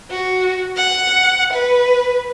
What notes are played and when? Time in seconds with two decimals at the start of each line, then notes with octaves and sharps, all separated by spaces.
0.11 F#4
0.76 F#5
1.53 B4